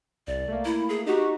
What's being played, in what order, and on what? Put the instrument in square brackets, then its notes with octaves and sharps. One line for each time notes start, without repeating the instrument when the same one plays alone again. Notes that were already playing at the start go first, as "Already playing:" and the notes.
[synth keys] C2 [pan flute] D5
[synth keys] A3 A#3
[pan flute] E4
G#4
[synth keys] D#4 F#4 [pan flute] G4